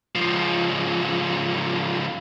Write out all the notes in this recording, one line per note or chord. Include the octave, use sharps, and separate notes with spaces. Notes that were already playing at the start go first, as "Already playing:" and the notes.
C#2 F3